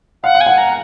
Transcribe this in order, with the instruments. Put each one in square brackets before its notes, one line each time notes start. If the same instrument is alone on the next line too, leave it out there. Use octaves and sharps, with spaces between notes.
[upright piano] F5 [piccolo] F#5
[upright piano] F5
[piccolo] G#5
[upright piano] F#5
[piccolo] A#5